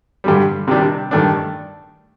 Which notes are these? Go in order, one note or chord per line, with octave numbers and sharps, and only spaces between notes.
G2 D3 G3
C3 D#3 G3 D4 G4
G2 D#3 A3 D4